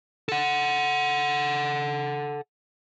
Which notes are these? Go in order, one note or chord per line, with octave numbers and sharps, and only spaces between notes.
A4 F#5